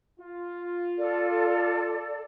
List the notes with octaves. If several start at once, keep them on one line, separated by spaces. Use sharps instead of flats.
F4
A4 D5